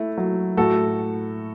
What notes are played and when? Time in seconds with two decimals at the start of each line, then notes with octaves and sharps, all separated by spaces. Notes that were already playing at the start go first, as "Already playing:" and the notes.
Already playing: A3 E4
0.17 F#3
0.57 A2 F#4 A4